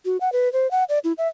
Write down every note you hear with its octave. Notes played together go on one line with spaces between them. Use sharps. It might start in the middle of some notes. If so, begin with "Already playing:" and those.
F#4
F#5
B4
C5
F#5
D5
E4
E5